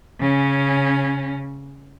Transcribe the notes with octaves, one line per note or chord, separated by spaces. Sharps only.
C#3 C#4